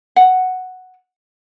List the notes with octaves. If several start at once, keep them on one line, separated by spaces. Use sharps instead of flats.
F#5